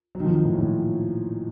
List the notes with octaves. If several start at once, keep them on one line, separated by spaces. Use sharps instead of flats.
F#3
D#3
F3
D#3
A2
A#2
A2